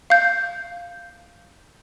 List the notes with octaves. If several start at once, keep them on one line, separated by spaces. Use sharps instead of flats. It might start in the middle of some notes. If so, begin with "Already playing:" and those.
F5 G6